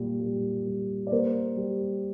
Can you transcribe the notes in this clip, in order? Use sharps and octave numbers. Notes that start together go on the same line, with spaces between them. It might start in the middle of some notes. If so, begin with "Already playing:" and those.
Already playing: A#2 G3
G3
G3
D5
A#3 C5
G3